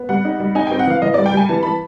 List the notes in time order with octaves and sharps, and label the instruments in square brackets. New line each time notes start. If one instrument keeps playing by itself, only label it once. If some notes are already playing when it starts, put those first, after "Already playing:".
Already playing: [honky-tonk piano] B3
G3 F#5
D#4
G3
D#4 G#5
C4 G5
F#5
E3 F5
E3 D#5
G3 D5
G5
G3 G#5
E3 A5
E3 B5